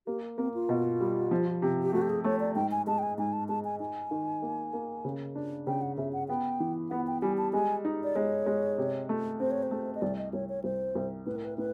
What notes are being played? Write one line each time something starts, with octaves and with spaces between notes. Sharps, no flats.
A#3 G4
A#3 C4
F4
B2
G3
F3
C3
G4
A3 F#4
G4
G#4
A3 C#5
D5
G#2 G5
G#5
G#3 A5
G5
G#5
G#2 G#5
A5
G#3 A5
G#5
D#4 G#5
D#3
A#3
A#3
C#3
D4
C#3 G5
F#5
C#3 E5
F#5
B3 G5
E3
B3 F#5
G5
G3 G#5
A5
G#3 G#5
D#4
D5
G#3 C#5
G#3
C3
A3
C4 C5
C#5
C5
A3
D#5
C2 D5
D#5
C2 C#5
C#5
C2 C5
C2
A2 B4
A#4
B4
A2 B4